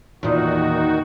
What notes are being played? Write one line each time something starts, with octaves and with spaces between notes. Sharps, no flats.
E2 A#2 D#3 D#4 F#4